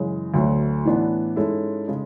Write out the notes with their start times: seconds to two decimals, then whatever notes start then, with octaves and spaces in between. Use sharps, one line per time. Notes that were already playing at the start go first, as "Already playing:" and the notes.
Already playing: F#2 C#3 E3 G#3
0.34 D2 D3 F#3 A3
0.85 A2 E3 B3 D4
1.36 G#2 G#3 C#4 E4 A4
1.88 C#3 G#3 C#4